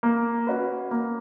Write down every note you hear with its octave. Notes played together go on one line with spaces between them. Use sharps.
A#3
C#4 F#4 B4
A#3